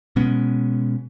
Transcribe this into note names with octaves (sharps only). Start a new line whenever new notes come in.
B2 G#3 B3 C#4